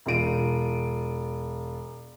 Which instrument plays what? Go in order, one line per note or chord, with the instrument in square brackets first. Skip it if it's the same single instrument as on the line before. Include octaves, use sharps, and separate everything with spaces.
[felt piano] E1 F4 D7 D#7